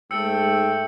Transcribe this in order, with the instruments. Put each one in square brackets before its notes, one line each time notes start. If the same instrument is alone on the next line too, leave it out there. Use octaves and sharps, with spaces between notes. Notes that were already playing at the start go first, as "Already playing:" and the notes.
[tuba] G#2 [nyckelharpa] A3 [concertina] G5 [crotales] E6 C#7